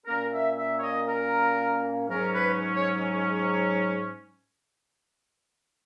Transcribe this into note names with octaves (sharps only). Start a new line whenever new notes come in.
A#2 A#3 C#4 A#4
E5
E5
C#5
D#5
A#4
G#2 F#3 C#4 A#4
B4
C#5